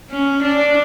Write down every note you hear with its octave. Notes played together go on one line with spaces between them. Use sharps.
C#4
D4